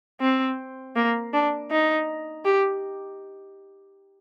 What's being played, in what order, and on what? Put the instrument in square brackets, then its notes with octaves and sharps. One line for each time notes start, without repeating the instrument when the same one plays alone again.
[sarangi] C4
A#3
D4
D#4
G4